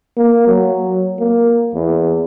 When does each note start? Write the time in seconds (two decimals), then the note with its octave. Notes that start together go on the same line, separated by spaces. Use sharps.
0.18 A#3
0.48 F#3
1.20 A#3
1.75 E2